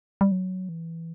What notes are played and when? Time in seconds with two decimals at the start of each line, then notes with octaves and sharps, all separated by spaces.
0.21 G3
0.32 F#3
0.69 E3